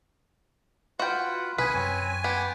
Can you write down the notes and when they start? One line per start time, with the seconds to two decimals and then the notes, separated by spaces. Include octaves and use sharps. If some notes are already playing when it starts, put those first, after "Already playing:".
0.99 F4 F#4 B4 F#5 G5
1.58 B1 C3 B4 G#5 D#6
1.74 F#2 C4 C#5
2.24 B3 G5 C6 D6